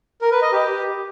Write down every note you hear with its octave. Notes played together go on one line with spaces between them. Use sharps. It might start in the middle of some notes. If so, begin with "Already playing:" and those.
A#4
B4
D#5
G4